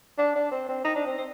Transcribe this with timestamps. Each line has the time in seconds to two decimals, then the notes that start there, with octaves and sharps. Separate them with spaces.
0.18 D4
0.35 D4
0.51 C4
0.69 C4
0.84 D#4
0.95 D4
1.07 C4
1.17 C4